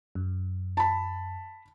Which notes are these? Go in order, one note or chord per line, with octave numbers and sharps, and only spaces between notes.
F#2
A5 B5